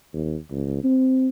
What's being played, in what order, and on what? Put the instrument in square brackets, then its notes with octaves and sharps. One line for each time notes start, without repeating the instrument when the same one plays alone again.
[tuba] D#2
C#2
C4